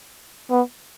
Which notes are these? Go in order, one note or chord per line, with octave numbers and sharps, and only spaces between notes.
B3